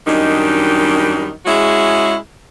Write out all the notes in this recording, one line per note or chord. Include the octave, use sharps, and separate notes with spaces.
F#2 D#3 G3 D4 D#4
G#3 C#4 E4 F#4 G#4